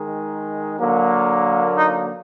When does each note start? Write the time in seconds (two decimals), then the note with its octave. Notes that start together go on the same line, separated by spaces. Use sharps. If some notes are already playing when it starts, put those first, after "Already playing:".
Already playing: D#3 G#3
0.79 D3 F#3 A#3
1.77 D#4